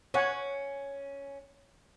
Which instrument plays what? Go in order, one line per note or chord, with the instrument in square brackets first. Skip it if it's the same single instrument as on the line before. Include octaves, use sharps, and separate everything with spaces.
[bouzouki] C#4 [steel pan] C#5 F#5 G#5